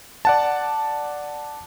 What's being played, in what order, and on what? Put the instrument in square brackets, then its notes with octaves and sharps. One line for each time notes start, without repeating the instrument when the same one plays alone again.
[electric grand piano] D5 F#5 A5